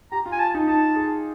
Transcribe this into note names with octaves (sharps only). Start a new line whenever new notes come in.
G4 A#5
F4
G#5
A5
D#4
D#4 A5
G#4